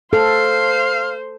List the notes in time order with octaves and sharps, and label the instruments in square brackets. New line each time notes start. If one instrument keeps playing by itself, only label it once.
[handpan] A4 [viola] C5 [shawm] F5